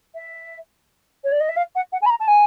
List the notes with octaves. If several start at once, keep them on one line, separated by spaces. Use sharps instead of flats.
E5
C#5
D5
D#5
E5
F5
F#5
F#5
G#5
B5
A#5
A5
G#5